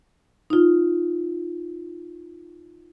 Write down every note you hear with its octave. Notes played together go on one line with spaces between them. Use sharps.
D#4 F4